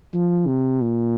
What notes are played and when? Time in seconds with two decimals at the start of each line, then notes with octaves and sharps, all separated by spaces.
0.14 F3
0.47 C3
0.82 A#2